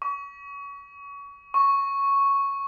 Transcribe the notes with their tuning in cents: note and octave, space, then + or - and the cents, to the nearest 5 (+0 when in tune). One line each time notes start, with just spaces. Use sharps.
C#6 +30
C#6 -5